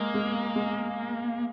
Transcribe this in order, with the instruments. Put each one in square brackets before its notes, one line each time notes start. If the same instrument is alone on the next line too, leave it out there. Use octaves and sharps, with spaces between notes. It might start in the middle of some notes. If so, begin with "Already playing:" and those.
Already playing: [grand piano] G#3 [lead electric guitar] A#3
[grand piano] G#3
G#3